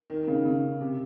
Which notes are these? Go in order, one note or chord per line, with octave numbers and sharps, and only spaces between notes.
D#3
D#3
C#3
C#3
C3